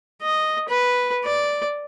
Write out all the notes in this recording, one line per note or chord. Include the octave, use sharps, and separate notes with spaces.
D#5
B4
D5